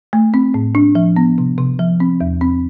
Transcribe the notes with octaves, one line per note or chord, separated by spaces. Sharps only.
A3
C4
A2
D4
F3
B3
C3
C3
F3
C4
E2
C4